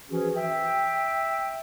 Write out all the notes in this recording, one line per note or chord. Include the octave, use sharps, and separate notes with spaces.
E3 F3 C#4 F#4 G#4
E5 G5